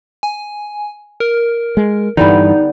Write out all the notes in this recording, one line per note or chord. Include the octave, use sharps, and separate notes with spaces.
G#5
A#4
G#3
G2 D3 E3 G3 B3 D#4